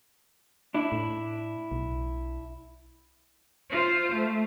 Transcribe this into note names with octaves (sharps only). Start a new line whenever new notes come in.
D4 E4
A2
B1
F4 C5
A3